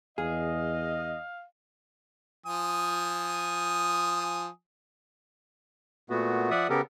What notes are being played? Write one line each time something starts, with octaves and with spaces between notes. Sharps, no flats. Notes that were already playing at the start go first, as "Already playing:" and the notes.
E2 G#4 D#5 F5
F3 G#5 D#6
A#2 A3 B3 F#4
F3 D5 E5 F#5 D#6
C#3 B3 G4 A4 A#4